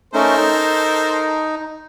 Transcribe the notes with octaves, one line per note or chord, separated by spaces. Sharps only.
A3 C#4 D#4 A4 A#4 C5
D#4